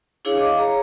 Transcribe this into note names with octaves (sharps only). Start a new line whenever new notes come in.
D4 E4 G#4 C#5 F5
D#5 F5 D6
G#4 C#5 A#5